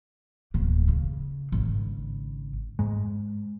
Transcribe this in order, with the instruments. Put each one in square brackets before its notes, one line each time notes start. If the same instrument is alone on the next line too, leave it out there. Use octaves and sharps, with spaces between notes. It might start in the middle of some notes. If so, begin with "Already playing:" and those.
[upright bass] D1 A#3
C#3
G#1 C#3
[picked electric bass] G#2 G#3